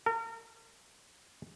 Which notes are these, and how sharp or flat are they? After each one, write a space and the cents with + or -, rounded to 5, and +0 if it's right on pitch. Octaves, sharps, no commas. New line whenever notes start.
A#4 -35